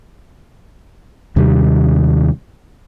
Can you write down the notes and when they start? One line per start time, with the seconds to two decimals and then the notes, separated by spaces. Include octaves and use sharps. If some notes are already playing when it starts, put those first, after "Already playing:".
1.36 D#2 C3 D#3 G3